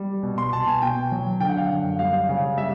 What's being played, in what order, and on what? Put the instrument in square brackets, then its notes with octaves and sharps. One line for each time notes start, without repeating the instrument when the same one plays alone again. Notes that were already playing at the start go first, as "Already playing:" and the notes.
Already playing: [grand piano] G3
B2
C6
B2 A5
G#5
B2 G5
F#3
D3 G5
F#5
F5
F#2 F#5
G3 F5
C#3
G3 E5